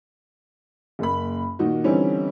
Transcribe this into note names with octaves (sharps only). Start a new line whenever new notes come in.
F#1 A#3 B5
A#2 D#3 D#4 F#4
D3 E3 G3 C4 C#4 D#4